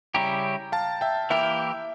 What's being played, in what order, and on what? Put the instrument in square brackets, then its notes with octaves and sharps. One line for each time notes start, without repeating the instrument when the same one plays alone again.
[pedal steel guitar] C#3 G3 C#4 E4 G4 [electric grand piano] G5 A#5
[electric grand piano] F5 A5
E5 G5
[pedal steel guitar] E3 A#3 E4 G4 A#4 [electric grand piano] E5 G5